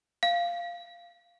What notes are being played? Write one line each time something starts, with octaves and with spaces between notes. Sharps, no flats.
F5